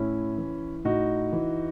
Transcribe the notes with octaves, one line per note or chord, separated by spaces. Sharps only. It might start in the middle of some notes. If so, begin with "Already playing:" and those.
Already playing: A2 C#4 E4
E3
A2 D#4 F#4
E3